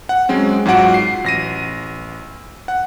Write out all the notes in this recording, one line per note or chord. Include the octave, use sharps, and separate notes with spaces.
F#5
F#3 G#3 C4 C#4
G#2 F#3 F4 F#4 F#5 D7
C7
A1 A#6 D#7
F#5